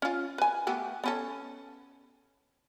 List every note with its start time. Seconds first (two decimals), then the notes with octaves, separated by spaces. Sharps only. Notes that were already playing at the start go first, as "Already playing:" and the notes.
0.02 C#4 F4
0.38 B4 G#5
0.67 A3 B3 G4
1.04 B3 C#4 A4